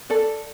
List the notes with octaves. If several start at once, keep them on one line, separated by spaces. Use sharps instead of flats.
A4 D5